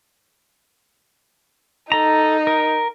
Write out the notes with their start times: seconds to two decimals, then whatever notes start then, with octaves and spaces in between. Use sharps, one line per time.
1.92 D#4 A4 A#5
2.47 A#4